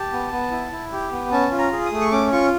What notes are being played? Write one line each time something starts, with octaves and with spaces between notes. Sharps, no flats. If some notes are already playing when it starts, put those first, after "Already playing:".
Already playing: G4 A5
B3
B3
E4
E4
G4
B3
C#4 A5
F4
A#5
G#4
D#6
A3
C#6
C#4 D6
F4 C#6